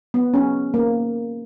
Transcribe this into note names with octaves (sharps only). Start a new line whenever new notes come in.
B3
C#4
A#3